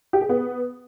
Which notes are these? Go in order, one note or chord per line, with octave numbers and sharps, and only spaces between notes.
G4
G#4
B3